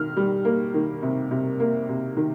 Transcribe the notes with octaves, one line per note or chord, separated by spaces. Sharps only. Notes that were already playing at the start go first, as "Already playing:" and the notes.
Already playing: D#3 F6
G3
A#3
D#3
C3
C3
A#3
C3
D#3